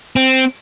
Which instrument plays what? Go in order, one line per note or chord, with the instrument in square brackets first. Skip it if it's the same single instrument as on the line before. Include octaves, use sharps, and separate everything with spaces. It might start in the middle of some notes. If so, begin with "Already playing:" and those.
[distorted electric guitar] C4